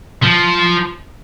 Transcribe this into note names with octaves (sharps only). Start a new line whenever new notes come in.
F3